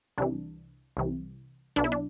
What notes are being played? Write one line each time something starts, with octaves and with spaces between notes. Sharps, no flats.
C2 C3 E3 D4
C2 C3 E3
B1 B2 D4
E4
D4